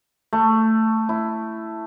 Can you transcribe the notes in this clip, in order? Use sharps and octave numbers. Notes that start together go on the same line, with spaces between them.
A3
E4